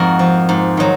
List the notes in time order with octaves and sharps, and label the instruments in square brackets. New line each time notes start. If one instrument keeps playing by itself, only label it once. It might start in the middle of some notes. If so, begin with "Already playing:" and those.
Already playing: [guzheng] F2 G#2 F#4 A#4
F3
G#2
D#3 F#3